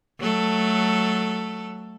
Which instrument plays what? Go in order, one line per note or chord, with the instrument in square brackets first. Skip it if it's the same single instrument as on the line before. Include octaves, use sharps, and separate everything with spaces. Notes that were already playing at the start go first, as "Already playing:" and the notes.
[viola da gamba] F#3 A3 A4